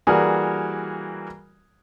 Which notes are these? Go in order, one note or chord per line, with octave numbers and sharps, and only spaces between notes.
E3 G3 A#3 F#4 G#4 A#4